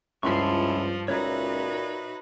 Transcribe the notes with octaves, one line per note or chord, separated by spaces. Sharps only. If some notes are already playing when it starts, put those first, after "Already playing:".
C#2 G2 F3 E4 A5 C6 C#6
C#2 A#2 D#4 F#4 B4 C#5 E5 A#5